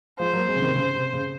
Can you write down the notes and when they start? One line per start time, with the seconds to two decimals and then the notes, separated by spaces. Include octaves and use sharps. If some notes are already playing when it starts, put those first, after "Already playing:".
0.20 F3 G#3 C5
0.33 F#3 A#3
0.48 G#3 C4
0.56 C#3
0.62 C3 D#3
0.76 C#3
0.95 C3
1.13 C#3